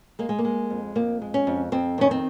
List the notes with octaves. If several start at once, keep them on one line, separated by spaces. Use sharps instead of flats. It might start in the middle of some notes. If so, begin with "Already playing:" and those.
G#3 A#3
G#3
A#3
G#3
F2
F2 A#3
G#3
C#4
F2
F2 C4
D#3 C#4
C4